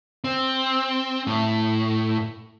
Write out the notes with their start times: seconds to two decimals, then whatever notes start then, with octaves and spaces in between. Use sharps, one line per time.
0.24 C4
1.27 A2